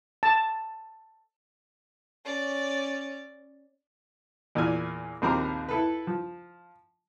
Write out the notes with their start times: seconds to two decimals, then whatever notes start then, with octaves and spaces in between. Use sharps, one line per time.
0.23 A5
2.25 C#4 D5
4.55 E2 A#2 D5 G#5 F6
5.22 A#1 D#2 C4 A#4 A#5 D6
5.69 E4 A4 B4
6.07 F3